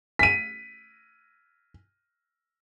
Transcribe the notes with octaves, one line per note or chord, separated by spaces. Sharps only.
B6 D#7